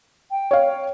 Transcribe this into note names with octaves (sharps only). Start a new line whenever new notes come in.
G5
C#5 F5